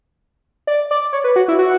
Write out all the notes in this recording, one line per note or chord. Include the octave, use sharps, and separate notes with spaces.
D5
D5
C#5
B4
F#4
E4
F#4